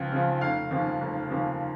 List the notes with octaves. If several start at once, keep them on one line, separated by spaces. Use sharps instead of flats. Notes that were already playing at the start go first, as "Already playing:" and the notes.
Already playing: C#2 C#3 F3
C#3 F3
F1 F5
D#2 C#3 F3
F1
D#2 C#3 F3